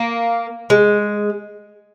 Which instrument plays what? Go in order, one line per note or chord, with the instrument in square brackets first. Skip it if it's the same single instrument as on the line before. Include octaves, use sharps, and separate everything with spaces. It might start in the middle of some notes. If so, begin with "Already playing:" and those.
Already playing: [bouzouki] A#3
G#3